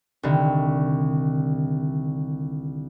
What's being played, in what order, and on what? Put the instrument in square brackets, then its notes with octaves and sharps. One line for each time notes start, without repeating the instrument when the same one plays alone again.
[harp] C2 D3 D#3